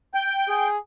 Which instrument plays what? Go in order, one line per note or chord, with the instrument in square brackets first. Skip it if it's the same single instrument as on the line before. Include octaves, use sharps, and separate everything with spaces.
[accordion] G5 G6
[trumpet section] G#4